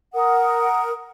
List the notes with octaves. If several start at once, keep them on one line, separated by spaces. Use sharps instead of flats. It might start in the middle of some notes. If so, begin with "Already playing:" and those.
A#4 F#5 D#6